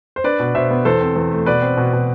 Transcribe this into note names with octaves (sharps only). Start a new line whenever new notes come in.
C5
D4 B4 D5
B2
B2 C5 E5
B3
E2 A4 C5
C4
E2
A3
B2 B4 D5
C4
B2
B2